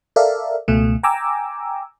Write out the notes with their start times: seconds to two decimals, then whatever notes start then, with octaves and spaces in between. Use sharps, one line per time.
0.16 A4 A#4 D5 E5 F5
0.68 C#2 B2 A3
1.03 G5 G#5 A#5 D6 E6